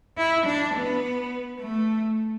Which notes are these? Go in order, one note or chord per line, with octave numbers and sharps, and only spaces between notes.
E4
D4
B3
A3